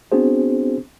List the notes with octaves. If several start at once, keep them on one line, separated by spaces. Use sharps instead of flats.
B3 C4 D4 F#4 G#4 C5